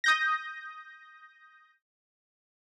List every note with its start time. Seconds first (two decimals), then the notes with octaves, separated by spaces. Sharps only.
0.04 D#6 G6 A#6